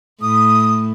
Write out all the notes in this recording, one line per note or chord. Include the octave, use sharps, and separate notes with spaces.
A2 D#6